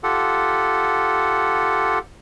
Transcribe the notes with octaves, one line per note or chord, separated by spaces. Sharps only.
F4 G4 A4 F#5